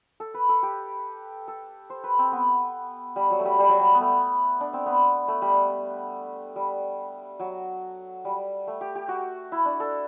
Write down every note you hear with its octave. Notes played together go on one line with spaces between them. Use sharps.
A4
B4
A4
G4
A4
C5
B4
C4
B3
G3
F#3
A3
G3
G3
F#3
G3
B3
A3
D4
C4
B3
A3
G3
G3
F#3
G3
A3
G4
G4
F#4
E4
D4
A4